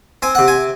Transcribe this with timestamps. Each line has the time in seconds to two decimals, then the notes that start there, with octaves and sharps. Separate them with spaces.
0.22 C4 G#5
0.35 C3 F#5
0.48 G#5